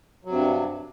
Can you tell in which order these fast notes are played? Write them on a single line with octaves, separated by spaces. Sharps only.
F#3 C3 G2